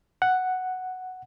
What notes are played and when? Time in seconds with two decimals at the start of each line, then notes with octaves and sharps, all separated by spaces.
0.22 F#5